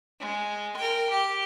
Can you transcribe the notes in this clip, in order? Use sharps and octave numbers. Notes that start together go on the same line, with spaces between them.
G#3
A#4 G5
G4